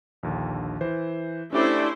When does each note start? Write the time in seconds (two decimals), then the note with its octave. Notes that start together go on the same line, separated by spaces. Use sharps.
0.23 A#1 D#2 D3
0.81 E3 C5
1.53 A3 C#4 D4 E4 G4 C5 D5